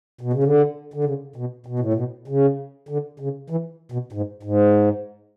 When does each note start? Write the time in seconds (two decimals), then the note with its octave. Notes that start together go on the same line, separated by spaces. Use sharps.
0.21 B2
0.33 C#3
0.44 D3
0.94 D3
1.04 C#3
1.36 B2
1.66 B2
1.79 A2
1.94 B2
2.28 C#3
2.89 D3
3.20 C#3
3.50 E3
3.92 B2
4.13 G#2
4.43 G#2